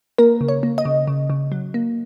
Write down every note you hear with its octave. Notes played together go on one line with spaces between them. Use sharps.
A#3 A#4
C#3
C#5
A#3
D#5
C#3
C#3
C#3
F#3
A#3